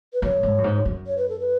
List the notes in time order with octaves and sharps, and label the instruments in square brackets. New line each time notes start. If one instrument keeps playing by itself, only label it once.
[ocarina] B4
[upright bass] F#2 [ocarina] C#5
[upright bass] G#2
F#2
G#2
F#2
[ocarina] C#5
B4
A4
B4